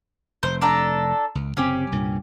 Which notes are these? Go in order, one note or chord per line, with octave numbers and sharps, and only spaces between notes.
F1 C5
D4 A4 A#5
C#2
F#1 C3 C4 C#4 G4
C2 G2 A#2